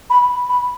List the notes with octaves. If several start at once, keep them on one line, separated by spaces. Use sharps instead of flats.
B5
B5